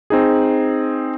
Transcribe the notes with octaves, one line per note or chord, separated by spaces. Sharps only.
C4 D#4 G#4